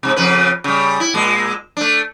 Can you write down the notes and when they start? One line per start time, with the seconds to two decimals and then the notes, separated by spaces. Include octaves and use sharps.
0.03 G#2 C3
0.16 F2 C#3 B4
0.64 C#3 G3
1.00 E4
1.14 A#2 G#3
1.77 A3 D4